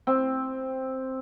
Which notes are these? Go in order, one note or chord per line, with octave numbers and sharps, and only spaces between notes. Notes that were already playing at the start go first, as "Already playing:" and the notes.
C4